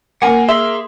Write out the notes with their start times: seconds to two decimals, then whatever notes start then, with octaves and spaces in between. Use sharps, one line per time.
0.22 A#3 F#5 G#5
0.49 G#4 E5 C6